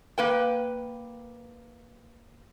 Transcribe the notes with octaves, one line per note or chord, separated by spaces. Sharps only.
A#3 B4 G5